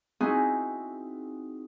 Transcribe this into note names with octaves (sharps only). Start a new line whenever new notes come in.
C4 D#4 E4 F#4 G#4